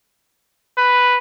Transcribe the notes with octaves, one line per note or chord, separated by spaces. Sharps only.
B4